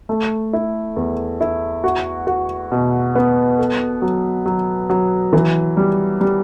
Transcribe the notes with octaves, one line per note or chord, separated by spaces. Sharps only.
A3
E4
E2
E4
F#4
F#4
B2
B3
A4
F#3
F#3
F#3
E3
G3
G3